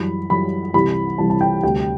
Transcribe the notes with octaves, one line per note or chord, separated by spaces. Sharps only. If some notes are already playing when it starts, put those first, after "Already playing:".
Already playing: F#2 E3 G3 B5
F#2 E3 G3 B5
C2 C3 E3 G3 B5
C2 C3 E3 G3 A5
A5
G5
D2 C3 G3 G5